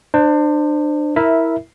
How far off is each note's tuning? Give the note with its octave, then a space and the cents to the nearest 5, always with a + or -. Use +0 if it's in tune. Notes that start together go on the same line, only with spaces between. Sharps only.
D4 +30 C5 +0
E4 -10 A#4 +0 E5 +0